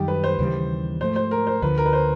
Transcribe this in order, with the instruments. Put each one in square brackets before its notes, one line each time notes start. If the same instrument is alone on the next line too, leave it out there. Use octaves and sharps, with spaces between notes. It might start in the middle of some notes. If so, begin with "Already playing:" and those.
Already playing: [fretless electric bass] F#2 D#3 G3 [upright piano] G4
[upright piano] B4
C5
[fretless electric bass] D#2 C#3 E3 G3
[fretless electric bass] G#2 F3 A3 [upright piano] C5
[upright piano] C5
A#4
C5
[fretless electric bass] D2 D3 F3 [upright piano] B4
[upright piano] A#4
B4
C5